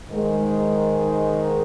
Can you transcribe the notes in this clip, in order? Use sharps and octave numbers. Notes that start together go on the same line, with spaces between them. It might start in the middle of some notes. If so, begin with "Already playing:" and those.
G#2 D#3 G#3